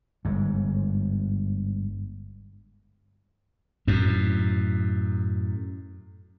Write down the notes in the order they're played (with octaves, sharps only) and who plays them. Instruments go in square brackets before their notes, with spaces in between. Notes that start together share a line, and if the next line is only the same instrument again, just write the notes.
[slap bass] G1 G#2
F#2 A2